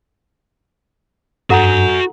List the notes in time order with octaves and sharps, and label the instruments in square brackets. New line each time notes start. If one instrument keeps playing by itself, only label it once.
[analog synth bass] G2 [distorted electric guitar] F#4 G#5 [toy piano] A4 F#5 A#5